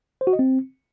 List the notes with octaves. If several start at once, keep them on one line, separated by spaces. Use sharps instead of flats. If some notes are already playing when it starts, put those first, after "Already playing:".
C5
F#4
D#5
C4